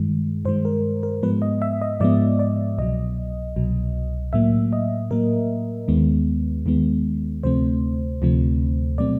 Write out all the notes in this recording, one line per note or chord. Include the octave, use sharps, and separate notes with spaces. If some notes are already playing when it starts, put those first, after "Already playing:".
Already playing: G2 D#3 G#3
G2 D#3 G#3 C5
A#4
A#4
G#2 F3 G#3 B3 B4
D#5
E5
D#5
G#2 F3 G#3 B3 D5
D5
C2 B2 F#3 D#5
C2 B2 F#3
A2 F#3 A#3 E5
D#5
A2 F#3 A#3 A#4
D#2 D#3 G#3 B3
D#2 D#3 G#3 B3
D2 C3 F3 A3 C4 C5
D2 C3 F3 A3 C4
B2 F#3 A3 C4 D5